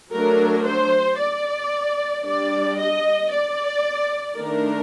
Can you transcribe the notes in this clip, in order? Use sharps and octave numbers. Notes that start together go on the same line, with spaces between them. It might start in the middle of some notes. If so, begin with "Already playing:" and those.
F#3 A3 D4 A#4
C5
D5
G3 D4 D5
D#5
D5
D#3 A3 D4 A#4